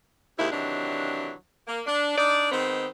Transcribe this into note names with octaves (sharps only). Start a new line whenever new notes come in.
D#2 C3 D#3 G#3 E4
C3 D#3 E3 F#3 D4
A#3
D4
D4 D#4 D5
D#3 G#3 B3 C4